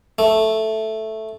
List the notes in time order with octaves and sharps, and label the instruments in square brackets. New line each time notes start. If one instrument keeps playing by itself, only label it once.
[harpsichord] A3